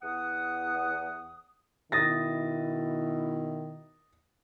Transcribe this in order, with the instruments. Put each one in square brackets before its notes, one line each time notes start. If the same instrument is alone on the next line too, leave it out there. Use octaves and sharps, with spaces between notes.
[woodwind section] E2 F#5 D#6
[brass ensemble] B2 E4 [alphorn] D#3 [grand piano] D#6 A6 A#6